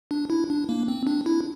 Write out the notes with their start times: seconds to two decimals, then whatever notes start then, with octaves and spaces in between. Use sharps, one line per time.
0.11 D4
0.30 E4
0.50 D4
0.69 A#3
0.88 C4
1.07 D4
1.26 E4